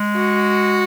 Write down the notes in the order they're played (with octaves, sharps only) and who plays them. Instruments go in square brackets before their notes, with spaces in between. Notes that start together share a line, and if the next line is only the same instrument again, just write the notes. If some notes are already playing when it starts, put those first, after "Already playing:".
Already playing: [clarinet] G#3
[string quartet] F#4